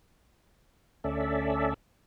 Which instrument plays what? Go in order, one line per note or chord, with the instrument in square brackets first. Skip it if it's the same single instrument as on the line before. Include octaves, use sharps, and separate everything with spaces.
[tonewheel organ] D2 C#4 A4 D5 E5